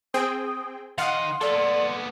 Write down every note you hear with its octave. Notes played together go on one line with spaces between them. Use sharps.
C4 G#4 G5 D#6
D#3 D#5 F5 F#5 C6
A#3 B3 A4 D5